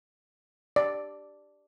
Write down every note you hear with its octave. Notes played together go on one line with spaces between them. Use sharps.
D5